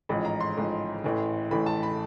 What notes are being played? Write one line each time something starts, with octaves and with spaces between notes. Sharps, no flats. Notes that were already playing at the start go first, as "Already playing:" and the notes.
A1 G#2 F3 G#3 B5
A#5
C6
A1 G#2 F3 G#3
A1 A2 E3
A1 A2 E3 B5
A5
B5